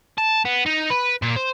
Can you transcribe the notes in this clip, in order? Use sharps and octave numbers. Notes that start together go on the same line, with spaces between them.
A5
B3
D#4
B4
A#2
C5